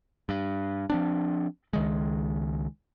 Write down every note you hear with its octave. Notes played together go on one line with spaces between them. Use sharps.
G2
F3 C4 D4
C#2 D#3 G#3